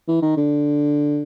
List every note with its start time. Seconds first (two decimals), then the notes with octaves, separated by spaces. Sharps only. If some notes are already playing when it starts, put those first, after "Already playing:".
0.08 E3
0.22 D#3
0.37 D3